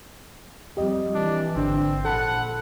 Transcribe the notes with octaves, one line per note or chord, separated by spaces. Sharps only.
F2 G3 G4 D#5
E3 D4
G#1 D3 C4 D4
A#1 A4 F#5 A5 B5